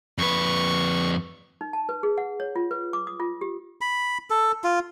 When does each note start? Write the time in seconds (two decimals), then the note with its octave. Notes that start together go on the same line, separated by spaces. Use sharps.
0.18 F2 B4 C#6
1.61 D#4
1.73 A5
1.89 B4
2.03 G#4
2.18 F#5
2.40 C#5
2.56 F4
2.71 B4
2.93 D6
3.07 D#6
3.20 F4
3.41 G4
3.81 B5
4.30 A4
4.64 F4